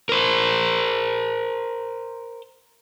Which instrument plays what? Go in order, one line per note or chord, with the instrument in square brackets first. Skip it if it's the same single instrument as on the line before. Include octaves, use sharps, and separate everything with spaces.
[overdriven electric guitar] A#4 C5